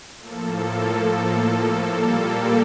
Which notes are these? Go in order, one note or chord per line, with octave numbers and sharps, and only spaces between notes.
A2 F3 A#3 A4
A#2 G3 A#3 A4